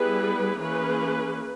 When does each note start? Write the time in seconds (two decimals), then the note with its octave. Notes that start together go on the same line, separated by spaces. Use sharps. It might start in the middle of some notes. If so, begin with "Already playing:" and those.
Already playing: G3 B3 E4 G#4 B4
0.58 E3 A#3 C#4 G#4 B4